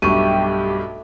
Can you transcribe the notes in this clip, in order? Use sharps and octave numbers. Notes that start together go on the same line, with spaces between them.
B1 G2 A3 G4 C#6 D#7